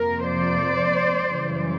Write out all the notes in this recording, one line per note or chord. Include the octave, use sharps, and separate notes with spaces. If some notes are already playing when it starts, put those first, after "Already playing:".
Already playing: F2 C3 F3 A#3 A#4
C5 D5
F#2 C#3 E3 G3